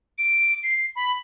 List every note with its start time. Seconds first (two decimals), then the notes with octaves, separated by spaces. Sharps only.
0.18 D7
0.63 C7
0.96 B5